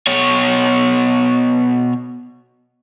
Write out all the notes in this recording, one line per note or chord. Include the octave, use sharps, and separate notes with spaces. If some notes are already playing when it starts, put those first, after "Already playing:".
B2 C#5